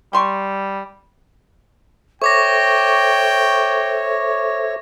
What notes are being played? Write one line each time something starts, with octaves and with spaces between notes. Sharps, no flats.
G3 G5 C6 C#6
A4 C5 C#5 E5 G5 C#6 D6 A#6